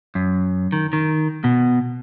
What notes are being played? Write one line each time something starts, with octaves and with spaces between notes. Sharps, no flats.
F#2
D#3
D#3
B2